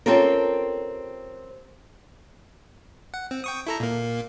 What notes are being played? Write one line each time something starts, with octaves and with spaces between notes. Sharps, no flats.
C4 C#4 F4 G4 A4 A#4
F#5
C4
G5 C#6 D#6
E4 A4 A#5
A#2 A#3